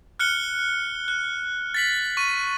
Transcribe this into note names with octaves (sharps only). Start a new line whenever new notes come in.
F6 F#6 C#7 G7
F#6
A6 B6 F#7
C#6 D#7